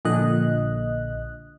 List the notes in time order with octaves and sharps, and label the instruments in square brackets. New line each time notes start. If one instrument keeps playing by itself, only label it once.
[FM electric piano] A#1 A#2 D3 D#5 F#6